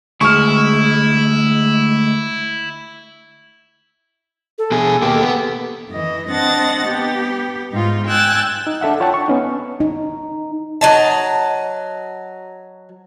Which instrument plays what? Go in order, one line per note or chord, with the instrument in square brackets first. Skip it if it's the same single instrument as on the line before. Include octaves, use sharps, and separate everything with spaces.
[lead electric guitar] D2 G#3 [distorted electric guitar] E4 [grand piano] C#6 F6
[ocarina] A4
[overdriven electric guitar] B2 G#4
A#3 G4
B3
[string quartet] F#2 E3 D#5
C4 D4 D#5 F#5 A5 A6
B3 G4
G#2 D#4 F4
G5 G#5 E6 F#6 A6
[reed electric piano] D#4
D4 A4 E5 F#5
F4 C#5 F#5 G5 A5
C#6
B3 C#4 D#4
[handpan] D#4
[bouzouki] F#3 D#5 A5